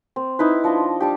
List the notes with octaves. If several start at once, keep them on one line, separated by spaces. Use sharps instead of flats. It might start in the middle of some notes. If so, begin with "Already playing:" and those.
C4
D#4 E4 B4
F3 D4 D#5 C6
G3 D4 G4